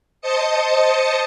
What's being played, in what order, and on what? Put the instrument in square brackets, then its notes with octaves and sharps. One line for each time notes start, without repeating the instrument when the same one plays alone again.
[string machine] C5 D#5 A5 D#6 C#7